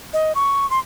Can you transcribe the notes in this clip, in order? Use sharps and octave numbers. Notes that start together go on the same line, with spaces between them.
D#5
C#6
C6